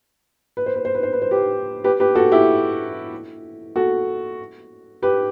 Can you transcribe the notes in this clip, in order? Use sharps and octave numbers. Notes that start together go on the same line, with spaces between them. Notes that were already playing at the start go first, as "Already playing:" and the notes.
B4
C5
B4
C5
B4
C5
B4
C5
G4 B4
G4 B4
G4 B4
F#4 A4
E4 G4
F#4 A4
G4 B4